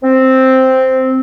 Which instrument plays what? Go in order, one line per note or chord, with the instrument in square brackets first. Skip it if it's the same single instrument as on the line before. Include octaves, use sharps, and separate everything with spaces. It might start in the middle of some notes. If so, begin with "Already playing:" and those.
[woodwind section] C4